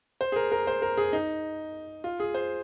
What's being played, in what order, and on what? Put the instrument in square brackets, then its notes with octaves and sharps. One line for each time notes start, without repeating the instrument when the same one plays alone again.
[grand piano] C5
G#4
A#4
A#4
C5
A#4
G#4
D#4
F4
G#4
C5